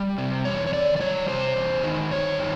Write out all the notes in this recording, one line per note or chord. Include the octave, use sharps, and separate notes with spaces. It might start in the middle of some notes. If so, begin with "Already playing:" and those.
Already playing: G3
C3
E2 C#5
C#5
D#3 D5
D5
G3 C#5
C3 C5
E2
D#3
G2 C#5
D#3